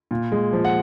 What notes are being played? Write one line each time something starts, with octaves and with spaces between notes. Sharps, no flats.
A#2
G#3
F3
F#5